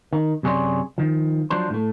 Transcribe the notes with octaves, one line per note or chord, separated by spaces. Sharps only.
D#3
F#2 C3 G#4 C#5 D5 C6
D#3 F3
F3 F#3 D4 C5
A2 A3